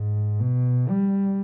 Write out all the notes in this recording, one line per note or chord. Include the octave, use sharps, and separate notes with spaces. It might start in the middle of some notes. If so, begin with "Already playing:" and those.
Already playing: G#2
B2
G3